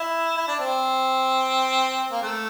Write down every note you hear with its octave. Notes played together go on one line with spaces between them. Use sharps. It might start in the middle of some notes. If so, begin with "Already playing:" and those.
Already playing: E4
E4
D4
C4
A#3
A3